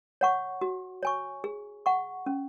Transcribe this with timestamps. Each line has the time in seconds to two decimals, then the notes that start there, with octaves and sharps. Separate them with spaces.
0.21 C#5 F#5 C#6
0.61 F#4
1.03 C#5 G#5 C#6
1.44 G#4
1.86 F#5 C#6
2.26 C#4